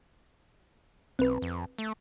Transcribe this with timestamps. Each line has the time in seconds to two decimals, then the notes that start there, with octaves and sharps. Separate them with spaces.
1.19 B1 C4 B4
1.42 F2
1.78 A3